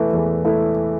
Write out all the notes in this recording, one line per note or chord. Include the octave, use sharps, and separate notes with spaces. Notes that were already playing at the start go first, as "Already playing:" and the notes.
Already playing: E2 E3 A3 E4
E2
A3 E4